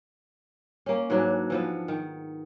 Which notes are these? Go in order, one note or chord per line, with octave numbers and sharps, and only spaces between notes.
A#3 C#4
G#2 E3 F#3 D4
E3 F3 B3
D#3